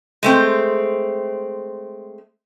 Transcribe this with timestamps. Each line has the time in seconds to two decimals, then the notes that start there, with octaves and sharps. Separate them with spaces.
0.23 G#3 A3 C4